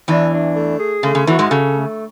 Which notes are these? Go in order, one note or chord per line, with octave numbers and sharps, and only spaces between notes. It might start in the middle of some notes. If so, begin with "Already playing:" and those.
E2 E3 D4
D4
A3
G#4
C#3 A3
C#3
E2 E3 F#4
G#2 G#3
C#3 A4
A3